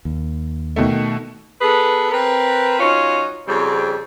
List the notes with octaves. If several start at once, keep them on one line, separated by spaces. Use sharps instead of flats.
D#2
B2 D#3 A3
B3 G#4 A4 B4
C4 A#4 B4
F#3 C#4 D#4 F4
F2 C#3 G3 C4